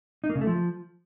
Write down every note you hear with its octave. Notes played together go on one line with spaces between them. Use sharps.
D#4
A#3
C#3
A3
F3